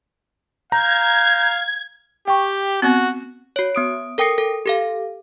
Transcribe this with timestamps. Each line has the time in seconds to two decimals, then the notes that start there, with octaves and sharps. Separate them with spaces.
0.72 F5 A#5 G6 G#6
2.28 G4 G5 C#6
2.82 B3 C4 F#4
3.56 F#4 C#5
3.75 B3 D#6 D7
4.18 A4 A#4 G5 D#6 A#6 C#7
4.38 A4
4.66 G4 A4 F5